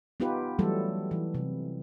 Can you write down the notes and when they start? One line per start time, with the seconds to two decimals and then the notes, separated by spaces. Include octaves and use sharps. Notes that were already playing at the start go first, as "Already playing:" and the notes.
0.20 B3 D#4 F4 G4 B4
0.59 E3 F#3 G3 A3 A4
1.11 E3
1.35 C3